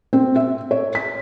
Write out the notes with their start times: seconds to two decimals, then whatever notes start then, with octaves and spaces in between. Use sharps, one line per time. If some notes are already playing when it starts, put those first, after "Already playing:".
0.13 C4
0.36 E5
0.71 C#5
0.95 B6